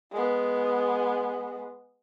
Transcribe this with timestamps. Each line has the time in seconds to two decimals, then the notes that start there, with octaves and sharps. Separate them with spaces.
0.12 G#3 B3